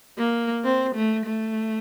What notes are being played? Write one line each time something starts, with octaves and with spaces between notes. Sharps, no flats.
A#3
C4
A3
A3